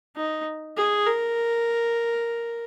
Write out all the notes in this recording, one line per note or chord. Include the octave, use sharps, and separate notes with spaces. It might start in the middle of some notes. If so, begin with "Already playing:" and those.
D#4
G#4
A#4